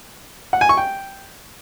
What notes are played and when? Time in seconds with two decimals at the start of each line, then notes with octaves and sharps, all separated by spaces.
0.53 F#5
0.61 G#5
0.69 C#6
0.77 G5